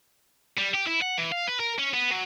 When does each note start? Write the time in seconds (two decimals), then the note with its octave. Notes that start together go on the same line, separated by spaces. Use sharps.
0.57 G3
0.74 G4
0.87 E4
1.01 F#5
1.17 E3
1.32 F5
1.47 B4
1.60 A#4
1.79 C#4
1.94 B3
2.11 F#3